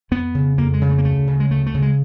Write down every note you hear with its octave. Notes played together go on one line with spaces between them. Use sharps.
F2 B3
C#3
F2 A#3
G#3
C#3
A3
A#3
D2 A3
C#3
G#3
D2 A3
A3
C#3
G#3